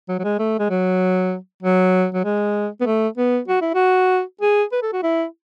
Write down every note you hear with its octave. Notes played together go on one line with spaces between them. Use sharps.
F#3
F#3
G#3
A3
G#3
F#3
F#3
F#3
G#3
B3
A3
B3
F#4
E4
F#4
G#4
B4
A4
F#4
E4